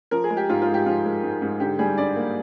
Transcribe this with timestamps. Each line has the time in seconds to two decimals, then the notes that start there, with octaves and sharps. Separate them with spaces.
0.11 F3 A#4
0.24 G#4
0.30 G#3
0.37 G4
0.49 G#2 F4
0.62 F4
0.68 G#2
0.74 G4
0.86 F3 F4
1.05 G#3
1.23 G#2
1.42 G#2
1.60 D3 G4
1.79 G3 G#4
1.98 G2 D5
2.16 A#3